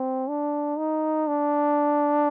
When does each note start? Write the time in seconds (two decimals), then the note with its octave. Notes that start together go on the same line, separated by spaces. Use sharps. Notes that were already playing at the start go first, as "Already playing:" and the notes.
Already playing: C4
0.29 D4
0.78 D#4
1.28 D4